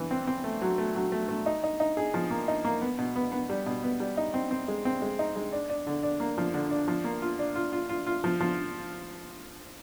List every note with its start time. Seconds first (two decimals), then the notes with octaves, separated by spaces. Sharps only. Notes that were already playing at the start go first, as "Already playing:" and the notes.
Already playing: E3
0.11 C4
0.27 C4
0.44 A3
0.62 F#3
0.78 A3
0.95 F#3
1.12 A3
1.29 A3
1.46 D#4
1.64 D#4
1.80 D#4
1.97 G#4
2.14 F3
2.31 A#3
2.48 D#4
2.65 A#3
2.81 B3
2.98 B2
3.16 B3
3.32 B3
3.49 G3
3.66 B2
3.83 B3
4.00 G3
4.17 D#4
4.34 C4
4.51 C4
4.68 G#3
4.85 C4
5.02 G#3
5.19 D#4
5.36 G#3
5.52 D4
5.70 D4
5.87 D3
6.03 D4
6.20 A#3
6.38 F3
6.54 D3
6.71 D4
6.88 F3
7.04 A#3
7.22 F4
7.39 D4
7.55 F4
7.73 F4
7.89 F4
8.07 F4
8.24 F3
8.40 F3